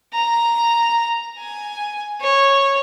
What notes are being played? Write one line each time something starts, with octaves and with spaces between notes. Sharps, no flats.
A#5
G#5
C#5